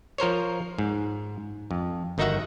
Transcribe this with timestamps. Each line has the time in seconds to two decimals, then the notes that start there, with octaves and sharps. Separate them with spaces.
0.18 F3 A#4 C5 C#5
0.78 G#2
1.71 F2
2.18 G1 D#3 D#4 F#4 E5 F#5